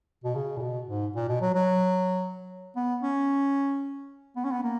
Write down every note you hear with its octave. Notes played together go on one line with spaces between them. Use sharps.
B2
C#3
A#2
B2
G#2
A#2
B2
F#3
F#3
B3
C#4
B3
C#4
B3
A#3